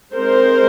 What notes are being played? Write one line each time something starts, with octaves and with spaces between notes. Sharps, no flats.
G#3 C4 D#4 A#4 C5